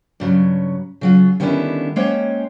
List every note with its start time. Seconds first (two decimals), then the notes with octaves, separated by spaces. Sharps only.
0.20 G2 C#3 F#3
1.01 C#3 F#3 F4
1.40 D3 D#3 G3 B3 C#4 E4
1.96 G#3 A#3 C#4 C5 C#5 G5